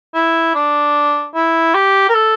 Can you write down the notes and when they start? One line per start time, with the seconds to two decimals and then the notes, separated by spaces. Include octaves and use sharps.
0.15 E4
0.55 D4
1.35 E4
1.75 G4
2.09 A#4
2.15 A4